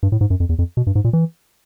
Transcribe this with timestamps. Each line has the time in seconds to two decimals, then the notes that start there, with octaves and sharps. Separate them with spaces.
0.03 G2
0.12 A2
0.21 G#2
0.30 F#2
0.40 F2
0.49 E2
0.59 F2
0.77 B2
0.87 G2
0.95 G#2
1.04 A#2
1.13 E3